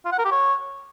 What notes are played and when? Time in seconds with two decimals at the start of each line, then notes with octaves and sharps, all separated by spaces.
0.05 F4
0.12 F#5
0.18 A#4
0.25 G4
0.31 C#5